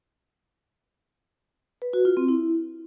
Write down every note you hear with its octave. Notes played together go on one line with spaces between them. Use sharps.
B4
F#4
F4
C4
E4